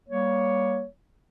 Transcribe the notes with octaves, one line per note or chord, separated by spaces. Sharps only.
G3 A#3 C#5